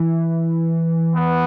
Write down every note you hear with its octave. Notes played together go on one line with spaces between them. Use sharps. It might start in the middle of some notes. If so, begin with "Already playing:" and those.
Already playing: E3
B3